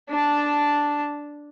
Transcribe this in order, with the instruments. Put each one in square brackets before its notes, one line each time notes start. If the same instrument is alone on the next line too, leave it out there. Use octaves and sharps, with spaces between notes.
[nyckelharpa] D4 A5